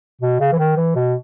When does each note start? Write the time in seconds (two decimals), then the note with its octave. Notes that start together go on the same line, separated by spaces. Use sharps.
0.21 B2
0.40 C#3
0.52 E3
0.58 D#3
0.76 E3
0.95 B2